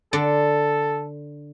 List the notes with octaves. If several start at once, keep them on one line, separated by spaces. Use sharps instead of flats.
D3 A4 D5